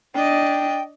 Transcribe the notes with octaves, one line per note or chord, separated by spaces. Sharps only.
D4 D#5 G5